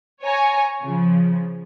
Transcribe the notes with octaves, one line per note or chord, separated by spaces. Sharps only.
C#5 G#5 A#5
C#3 F3